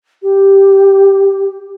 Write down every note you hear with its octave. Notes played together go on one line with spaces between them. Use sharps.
G4